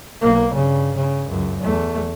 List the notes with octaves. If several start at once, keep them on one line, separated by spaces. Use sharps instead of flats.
B1 A#3
G2 C#3
C#3
C#2 F#2
E2 A3